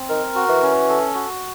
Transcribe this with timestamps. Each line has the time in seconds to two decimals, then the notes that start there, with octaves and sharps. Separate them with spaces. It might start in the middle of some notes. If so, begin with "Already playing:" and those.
Already playing: C4
0.09 D#3 A#4
0.35 F#4
0.49 E3
0.62 C#4
0.89 A4
1.14 F#4